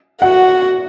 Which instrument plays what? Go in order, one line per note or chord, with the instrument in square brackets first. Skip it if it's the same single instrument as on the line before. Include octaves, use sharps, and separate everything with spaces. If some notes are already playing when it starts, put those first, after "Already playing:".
[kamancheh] F#4 [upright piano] F#5